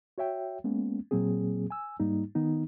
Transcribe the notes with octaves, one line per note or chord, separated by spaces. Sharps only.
F#4 C#5 E5 G5
G#3 A#3 B3 C#4
A#2 F#3 A#3 C4 G#4
G#5 E6
G#2 G3 A#3 D#4
D#3 B3 D#4